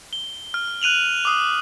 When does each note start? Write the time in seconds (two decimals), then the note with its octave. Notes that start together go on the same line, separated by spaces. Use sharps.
0.13 G7
0.54 F6
0.81 F#6 D#7 F7 F#7
1.25 D6 D#6 F7